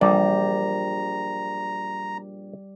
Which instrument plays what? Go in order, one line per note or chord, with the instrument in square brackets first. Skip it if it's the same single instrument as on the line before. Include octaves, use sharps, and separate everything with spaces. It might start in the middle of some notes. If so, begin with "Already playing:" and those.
[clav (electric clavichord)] A#1 D5 [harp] G3 [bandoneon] A#5